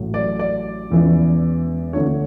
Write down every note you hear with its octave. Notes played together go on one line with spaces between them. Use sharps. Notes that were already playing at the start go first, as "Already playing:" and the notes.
Already playing: A1 A2 F#3
D5
D5
E1 E2 C#3 E3
D2 D3 A3 D4 C#5